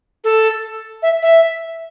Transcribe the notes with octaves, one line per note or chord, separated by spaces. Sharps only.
A4
E5
E5